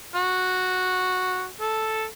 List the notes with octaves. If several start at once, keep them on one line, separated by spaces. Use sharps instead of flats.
F#4
A4